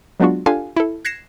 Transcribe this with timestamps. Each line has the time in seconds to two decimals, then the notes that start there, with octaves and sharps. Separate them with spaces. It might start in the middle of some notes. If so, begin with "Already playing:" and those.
0.20 F#3 G#3 B3 D4 F4 F#4
0.46 D4 F4 G4 A4 F5 G#5
0.76 E4 A4
1.05 F#6 G#6 A#6 C7 C#7 E7